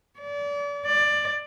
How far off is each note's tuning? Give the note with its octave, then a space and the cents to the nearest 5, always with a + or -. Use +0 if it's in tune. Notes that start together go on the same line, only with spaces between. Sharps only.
D5 -35
D5 +15